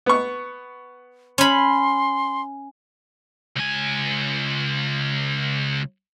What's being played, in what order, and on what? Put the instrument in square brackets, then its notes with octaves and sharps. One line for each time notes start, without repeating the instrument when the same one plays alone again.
[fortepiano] B3 C#6
[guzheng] C#4 B5 [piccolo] C6
[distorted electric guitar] C#2 G#5